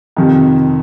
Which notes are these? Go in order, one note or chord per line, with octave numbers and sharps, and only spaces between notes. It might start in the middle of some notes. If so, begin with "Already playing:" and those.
F2 C3 D#3